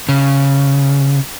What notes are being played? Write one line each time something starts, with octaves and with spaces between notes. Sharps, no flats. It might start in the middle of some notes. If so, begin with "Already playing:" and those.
C#3